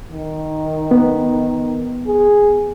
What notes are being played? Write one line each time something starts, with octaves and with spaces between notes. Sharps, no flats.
D#3
B3
G#4